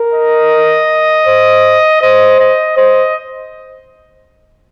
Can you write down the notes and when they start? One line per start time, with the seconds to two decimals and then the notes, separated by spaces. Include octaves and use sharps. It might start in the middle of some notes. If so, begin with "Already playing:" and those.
Already playing: A#4
0.14 D#5
1.27 C5
2.01 C5 D#5
2.39 D#5
2.76 C5 D#5